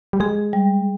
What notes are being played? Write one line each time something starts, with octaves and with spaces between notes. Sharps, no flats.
G3
G#3 G#4
G3